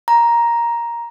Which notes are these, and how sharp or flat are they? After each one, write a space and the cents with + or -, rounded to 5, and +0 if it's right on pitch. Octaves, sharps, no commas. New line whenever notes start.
A#5 +10